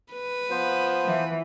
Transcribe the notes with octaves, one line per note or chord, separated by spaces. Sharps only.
B4
F3 B3 C5
E3